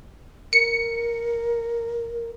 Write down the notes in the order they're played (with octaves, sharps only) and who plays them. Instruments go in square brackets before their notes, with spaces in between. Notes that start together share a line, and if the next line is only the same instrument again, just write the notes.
[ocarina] A#4 [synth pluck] C#7